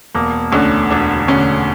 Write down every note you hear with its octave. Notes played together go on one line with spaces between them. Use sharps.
E1 A#3
D2 D3 C#4
E1 D4
D2 D3 C#4